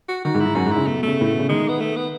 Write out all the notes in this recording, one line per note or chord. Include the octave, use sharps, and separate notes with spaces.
F#4
D#3 F#4
G#2
E4
G#2
F#2 F#4
G#2
E4
C#3
B2 A3
B2
C#3 A3
A2
B2
C#3
D#3 G#3
B3
A3
B3